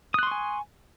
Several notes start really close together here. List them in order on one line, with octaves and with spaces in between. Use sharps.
D#6 F#6 C6 C#6 G#5